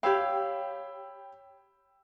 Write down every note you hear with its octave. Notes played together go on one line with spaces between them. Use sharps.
G4 C#5 F5 G5 B5 E6